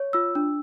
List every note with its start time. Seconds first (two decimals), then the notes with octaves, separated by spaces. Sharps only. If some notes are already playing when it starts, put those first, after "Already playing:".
Already playing: C#5
0.13 F4 E6
0.35 D4